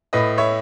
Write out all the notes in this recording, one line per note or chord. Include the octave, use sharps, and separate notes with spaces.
A2 B4 D#5
C#5 E5